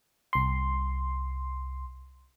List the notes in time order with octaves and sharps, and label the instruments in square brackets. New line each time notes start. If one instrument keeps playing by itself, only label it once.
[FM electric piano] C2 C6